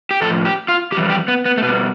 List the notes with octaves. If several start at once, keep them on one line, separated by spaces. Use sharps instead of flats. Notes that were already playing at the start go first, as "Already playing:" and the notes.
G4
A2 F3 A4
G4
F4
F2 E3 G3 G4
G4
B3
B3
A3
B2 G3 B3